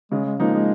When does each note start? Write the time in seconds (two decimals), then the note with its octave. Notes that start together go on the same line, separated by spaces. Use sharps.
0.12 C#3 G#3
0.25 G#3
0.39 F3 G#3 A#3 D#4
0.54 G#3